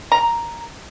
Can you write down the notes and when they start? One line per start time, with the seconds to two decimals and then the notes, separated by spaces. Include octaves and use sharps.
0.12 A#5